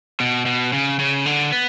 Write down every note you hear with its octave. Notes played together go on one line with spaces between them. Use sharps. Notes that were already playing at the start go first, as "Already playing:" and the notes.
B2
B2
C#3
C#3
D3
B3